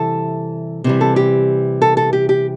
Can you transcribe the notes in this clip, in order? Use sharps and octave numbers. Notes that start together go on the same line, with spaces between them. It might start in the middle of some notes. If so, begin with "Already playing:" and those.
Already playing: C3 E3 G3 A4
C3 E3 G3
A4
G4
A4
A4
G4
G4